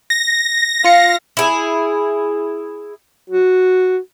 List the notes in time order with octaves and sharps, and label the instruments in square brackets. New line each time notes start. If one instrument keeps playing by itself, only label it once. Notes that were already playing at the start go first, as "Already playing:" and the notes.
[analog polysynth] A#6
[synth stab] F4 C#7 [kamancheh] F5
[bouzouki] E4 G#4
[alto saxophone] F#4